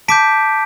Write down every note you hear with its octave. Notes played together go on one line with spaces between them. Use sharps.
A5 D6 G6 B6 D7